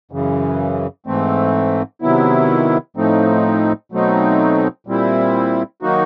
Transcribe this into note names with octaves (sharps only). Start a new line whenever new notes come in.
F#2 C#3 E3
G#2 E3 A3 C4
C3 D#3 F#3 B3 E4
A2 F3 A3 C4 D#4
B2 F#3 A3 C4 D#4
A#2 G3 C4 E4
D#3 F#3 A#3 D#4 F#4